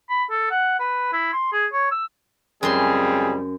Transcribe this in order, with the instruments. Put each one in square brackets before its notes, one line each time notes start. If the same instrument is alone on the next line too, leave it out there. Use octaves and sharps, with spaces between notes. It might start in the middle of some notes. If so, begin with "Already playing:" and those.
[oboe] B5
A4
F#5
B4
E4
C6
G#4
C#5
E6
[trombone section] C#2 G3 C4 [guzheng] F#2 C6 [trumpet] G#4